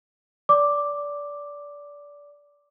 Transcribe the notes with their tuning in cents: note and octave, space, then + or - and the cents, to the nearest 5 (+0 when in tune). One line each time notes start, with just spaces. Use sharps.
D5 -20 D6 +0